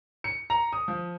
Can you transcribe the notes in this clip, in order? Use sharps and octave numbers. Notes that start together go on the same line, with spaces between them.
C#7
A#5
D#6
F3